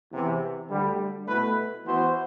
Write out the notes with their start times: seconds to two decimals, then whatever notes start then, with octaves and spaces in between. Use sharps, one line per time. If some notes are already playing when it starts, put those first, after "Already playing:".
0.11 E2 C3 E3
0.68 D2 D3 G3
1.27 B2 A3 E4 B4
1.85 E3 B3 F#4 C5